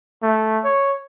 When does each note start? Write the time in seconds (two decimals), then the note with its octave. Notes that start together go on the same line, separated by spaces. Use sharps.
0.22 A3
0.65 C#5